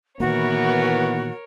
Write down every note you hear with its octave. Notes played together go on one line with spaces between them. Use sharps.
A#2 D#3 E3 A#3 B3 F#4 A#4 C#5